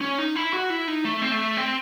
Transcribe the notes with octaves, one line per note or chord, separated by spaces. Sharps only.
C#4
D#4
E4
F#4
E4
D#4
A3
C4
A3
C4